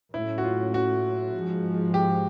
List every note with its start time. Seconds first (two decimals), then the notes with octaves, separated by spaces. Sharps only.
0.14 A2 F#3 A3 C#4 E4
0.38 F#4
0.44 F4
0.74 F#4
1.34 G#2 F3 G#3
1.94 G4